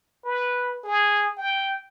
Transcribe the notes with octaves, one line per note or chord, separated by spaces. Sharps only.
B4
G#4
G5